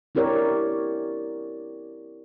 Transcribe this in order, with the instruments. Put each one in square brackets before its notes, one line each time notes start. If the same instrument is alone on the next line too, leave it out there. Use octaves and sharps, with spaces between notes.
[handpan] C4 E4 G4 A#4 C#5 D5